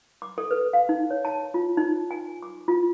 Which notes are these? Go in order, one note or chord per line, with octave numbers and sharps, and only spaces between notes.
D6
A4
B4
F5
D#4
C#5
A5
F4
D#4
G#5
D6
F4